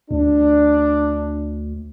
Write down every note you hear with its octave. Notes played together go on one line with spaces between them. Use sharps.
D2 D4